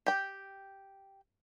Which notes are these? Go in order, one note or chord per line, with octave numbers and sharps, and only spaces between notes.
G4 G5